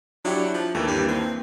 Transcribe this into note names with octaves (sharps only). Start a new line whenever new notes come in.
F#3 D4 E4 G4
F3
D#2 E3 A3 A#3
G2
C4